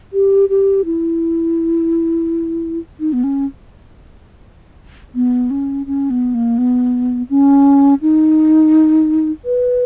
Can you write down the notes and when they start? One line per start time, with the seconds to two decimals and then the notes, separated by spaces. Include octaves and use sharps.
0.13 G4
0.49 G4
0.85 E4
3.00 D#4
3.13 B3
3.24 C#4
5.15 B3
5.51 C#4
5.86 C#4
6.10 B3
6.35 A#3
6.58 B3
7.30 C#4
8.02 D#4
9.45 B4